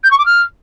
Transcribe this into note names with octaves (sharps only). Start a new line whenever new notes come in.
G6
C#6
D6
F6